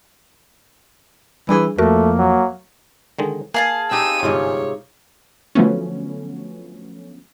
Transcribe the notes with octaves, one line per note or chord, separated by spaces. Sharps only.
E3 G3 D4 G#4
F2 A3 A#3 F#4 A#4
F#3
D3 D#3 G#3
A#3 G#4 F5 A5
C4 D#4 G4 E6 D#7
G1 G#2 C3 G#3 F4 C#5
D3 F3 F#3 A3 B3 C#4